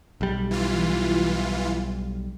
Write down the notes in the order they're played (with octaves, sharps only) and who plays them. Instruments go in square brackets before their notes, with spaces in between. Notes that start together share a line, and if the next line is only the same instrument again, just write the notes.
[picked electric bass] B1 G3
[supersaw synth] E3 F4